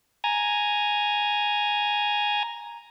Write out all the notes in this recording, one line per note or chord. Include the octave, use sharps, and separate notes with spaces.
G#5 A#5